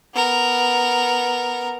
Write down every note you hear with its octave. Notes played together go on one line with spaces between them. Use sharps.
B3 A#4